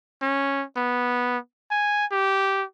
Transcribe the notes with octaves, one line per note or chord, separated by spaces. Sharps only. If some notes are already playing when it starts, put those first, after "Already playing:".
C#4
B3
G#5
G4